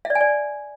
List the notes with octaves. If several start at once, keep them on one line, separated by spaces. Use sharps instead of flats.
E5
D5
G#5
D5